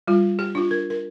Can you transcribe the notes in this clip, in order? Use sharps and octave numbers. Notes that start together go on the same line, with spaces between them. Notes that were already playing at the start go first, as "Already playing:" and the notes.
G3 F4
G4
D4 F4
A#4
A#4